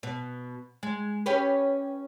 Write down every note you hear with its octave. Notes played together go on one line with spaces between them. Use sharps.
B2
G#3
C#4 G4 B4